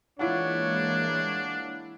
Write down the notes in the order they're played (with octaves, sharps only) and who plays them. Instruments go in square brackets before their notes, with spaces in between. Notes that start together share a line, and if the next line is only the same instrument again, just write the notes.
[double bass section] E3 G#3 A#3 [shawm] D4 [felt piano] E4 F4 F#5 [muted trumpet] C#5